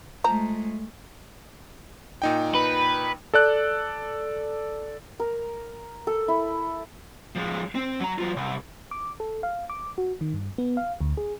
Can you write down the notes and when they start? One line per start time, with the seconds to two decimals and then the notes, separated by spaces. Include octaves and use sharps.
0.24 F3 G#3 A3 A#5
2.22 A#2 D#4 G5
2.55 B4
3.34 A4 D5 F#6
5.20 A#4
6.07 A4
6.28 E4
7.35 F3 G#3
7.75 C4
8.00 F#3 A#5
8.18 F#3 F4
8.36 C2
8.91 D6
9.20 A4
9.43 F5
9.70 D6
9.98 F#4
10.21 D#3
10.34 G2
10.58 B3
10.77 F5
11.01 D2
11.17 G#4